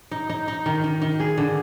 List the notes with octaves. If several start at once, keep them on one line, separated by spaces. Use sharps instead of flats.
D#4
D#4
D#4
D#3
D#3
D#3
G#4
D3